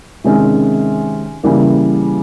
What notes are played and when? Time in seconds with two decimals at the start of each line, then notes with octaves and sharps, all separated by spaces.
0.24 C3 D#3 G#3 C#4
1.43 C#3 E3 G3 A#3